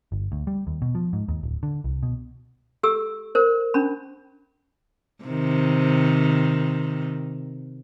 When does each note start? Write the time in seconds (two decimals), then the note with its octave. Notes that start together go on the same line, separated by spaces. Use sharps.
0.12 G1
0.32 D2
0.47 G3
0.67 D#2
0.82 B2
0.95 F3
1.13 G#2
1.28 D#2
1.43 D1
1.63 D3
1.84 C2
2.03 B2
2.83 G4 A4 E6
3.35 A#4 C5
3.74 C#4 D4 B5
5.24 C3 D#3